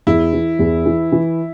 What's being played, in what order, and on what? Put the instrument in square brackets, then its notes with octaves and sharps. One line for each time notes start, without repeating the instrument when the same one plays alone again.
[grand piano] E2 [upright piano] E4
[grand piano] E3
E2
E3
E3